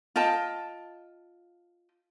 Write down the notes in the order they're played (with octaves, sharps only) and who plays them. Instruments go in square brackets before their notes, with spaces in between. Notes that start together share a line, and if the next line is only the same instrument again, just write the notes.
[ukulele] F4 D#5 G5 A5